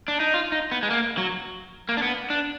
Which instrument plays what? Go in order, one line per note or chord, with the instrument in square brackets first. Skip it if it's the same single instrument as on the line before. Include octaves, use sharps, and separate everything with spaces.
[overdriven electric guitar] D4
D#4
F4
D#4
B3
G#3
A#3
F#3
A#3
D4
B3
D4